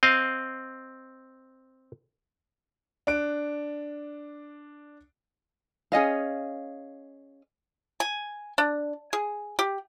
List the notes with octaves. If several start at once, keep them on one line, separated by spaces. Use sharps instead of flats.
C4 D#5 F5
D4 F#6 D7
C#4 G#4 D#5 F5
G#5
D4
G#4
G4